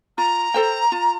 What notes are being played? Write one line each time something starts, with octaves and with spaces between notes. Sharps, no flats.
F4 A#5
A4 C5 G5
F4